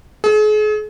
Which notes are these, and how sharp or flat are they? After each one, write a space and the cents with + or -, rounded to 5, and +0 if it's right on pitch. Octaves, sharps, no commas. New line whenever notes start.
G#4 +40